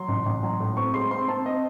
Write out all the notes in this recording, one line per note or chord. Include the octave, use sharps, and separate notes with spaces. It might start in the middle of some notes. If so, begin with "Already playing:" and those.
Already playing: F#3 C6
A1
A1
F#3
A2
C4 C#6
G#3 C6
C4 C6
C4 A5
C4 D#5